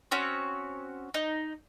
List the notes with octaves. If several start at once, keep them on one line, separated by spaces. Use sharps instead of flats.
C4 C#4 F#4 C#5
D#4